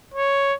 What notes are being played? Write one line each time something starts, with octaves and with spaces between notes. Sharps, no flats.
C#5